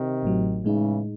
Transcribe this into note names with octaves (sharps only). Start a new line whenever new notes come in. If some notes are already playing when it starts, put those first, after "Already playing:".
Already playing: C3 D#3
A1 A2 F#3
A2 C#3 E3 G#3 D#4